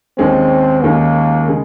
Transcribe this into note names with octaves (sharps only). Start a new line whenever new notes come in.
D#2 D#3 G#3 C4 C#4
D#2 D#3 G#3 A#3 C#4
C#3 G#3